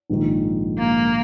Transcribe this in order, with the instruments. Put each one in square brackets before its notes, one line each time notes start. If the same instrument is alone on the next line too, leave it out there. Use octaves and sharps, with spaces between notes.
[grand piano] A#1 G#2 D#3
[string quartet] A#3